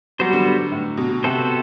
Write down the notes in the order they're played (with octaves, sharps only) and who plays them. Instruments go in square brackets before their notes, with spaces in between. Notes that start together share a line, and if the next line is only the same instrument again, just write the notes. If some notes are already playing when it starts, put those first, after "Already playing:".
[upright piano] F#3 [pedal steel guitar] G3 B3 F#4 C5
[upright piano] D3
A2
B2
[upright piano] C3 [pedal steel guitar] B3 F#4 A4 C5